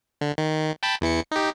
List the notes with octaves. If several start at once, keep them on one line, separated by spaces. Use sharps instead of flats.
D3
D#3
G5 A5 B5
E2 E3 C#7
D#4 G4